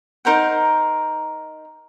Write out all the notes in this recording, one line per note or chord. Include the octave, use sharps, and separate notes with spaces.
D#4 A#4 C5 F#5